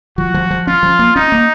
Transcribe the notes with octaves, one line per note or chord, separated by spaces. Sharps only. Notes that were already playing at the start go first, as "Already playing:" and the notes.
F3 F#4
F3
F3
C#4 F4
F3
A#3
C#4 D#4
A#3